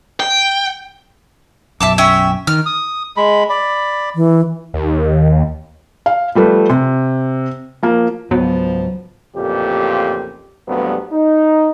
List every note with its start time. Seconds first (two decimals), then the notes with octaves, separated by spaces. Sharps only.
0.20 G5
1.80 B1 F#2 E5 A5 D6
1.98 C#4 E5 G5
2.47 D#3 F6
2.66 D#6
3.17 G#3 B5
3.50 D5 B5
4.15 E3
4.74 D#2
6.06 F5
6.35 F3 G3 A3 B4
6.70 C3
7.83 F3 A#3
8.31 C#2 G#2 F3 F#3 B3
9.36 A1 F2 A#2 C#3 G4
10.68 C2 G2 F3 F#3 A3 B3
11.12 D#4